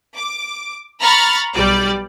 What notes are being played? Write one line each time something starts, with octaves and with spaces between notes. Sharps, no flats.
D6
A#5 B5 C#6 F6 A6
B1 G3 D5